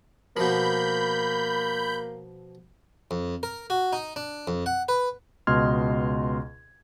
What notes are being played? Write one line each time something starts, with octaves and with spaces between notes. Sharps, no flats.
B2 F3 A#3 B5 G6
F2
A#4
F#4
D#4
D4
F2
F#5
B4
C#2 B2 D#5 C6 F6 G#6